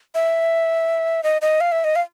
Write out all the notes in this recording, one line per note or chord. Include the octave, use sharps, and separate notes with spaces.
E5
D#5
D#5
F5
E5
D#5
F5